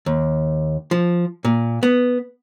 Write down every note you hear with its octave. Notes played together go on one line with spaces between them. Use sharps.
D#2
F3
A#2
B3